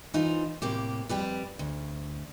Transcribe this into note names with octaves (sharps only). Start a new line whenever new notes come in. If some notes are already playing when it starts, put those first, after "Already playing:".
E3 D#4 F4 C5
A2 C3 A#3 G4
F2 G3 G4 B4
D2